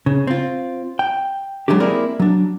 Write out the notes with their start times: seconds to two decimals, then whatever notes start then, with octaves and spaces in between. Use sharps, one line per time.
0.06 C#3
0.27 C4 F4
0.99 G5
1.68 F#3 G#3 A3 D4 G4
1.80 A#3 C4 E4 G#4 A#4 D5
2.20 F#3 D4